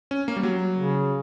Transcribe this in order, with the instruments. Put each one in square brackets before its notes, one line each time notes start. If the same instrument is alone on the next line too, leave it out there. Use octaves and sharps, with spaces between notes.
[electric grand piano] C#4
A#3
G3
F#3
[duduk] C#3